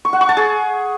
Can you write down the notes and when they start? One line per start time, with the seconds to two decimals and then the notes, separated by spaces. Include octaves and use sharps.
0.05 C#6
0.13 F#5
0.21 C#6
0.29 A5
0.37 G#4